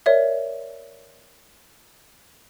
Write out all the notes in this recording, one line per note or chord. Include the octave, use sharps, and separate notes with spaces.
A#4 C#5 D5 E5